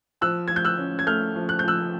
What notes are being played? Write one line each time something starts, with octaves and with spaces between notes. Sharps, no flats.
F3 E6 F#6
F3 G#6
G6
E6 F#6
C#4
G#6
A3 F6 G6
F3
F#6
G6
F3 E6 F#6